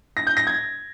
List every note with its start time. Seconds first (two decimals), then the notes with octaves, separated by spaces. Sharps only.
0.17 A#6
0.27 G6
0.37 A#6
0.47 G#6